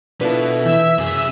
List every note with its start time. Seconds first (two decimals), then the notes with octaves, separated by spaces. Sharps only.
0.21 B2 D4 E4 F4 A4 B4
0.65 E3 E5 E6 G6
0.99 F#2 C3 G#4